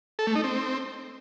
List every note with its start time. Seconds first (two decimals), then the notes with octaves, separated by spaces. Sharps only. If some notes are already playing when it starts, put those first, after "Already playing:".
0.19 A4
0.27 A3
0.35 D#4
0.44 C4